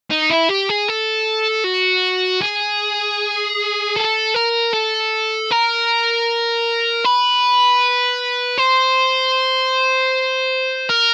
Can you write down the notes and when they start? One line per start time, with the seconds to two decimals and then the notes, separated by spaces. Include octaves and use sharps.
0.11 D#4
0.30 E4
0.49 G4
0.69 G#4
0.88 A4
1.64 F#4
2.42 G#4
3.96 A4
4.34 A#4
4.73 A4
5.51 A#4
7.05 B4
8.58 C5
10.89 A#4